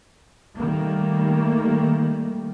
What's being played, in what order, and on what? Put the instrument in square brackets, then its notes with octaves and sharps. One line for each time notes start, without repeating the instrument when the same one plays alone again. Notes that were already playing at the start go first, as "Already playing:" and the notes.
[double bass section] D#3 G3 A3 A#3